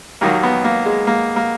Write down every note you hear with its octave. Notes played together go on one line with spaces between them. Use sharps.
D#2 D#3 F#3 A#3
B3
A#3
G#3
A#3
A#3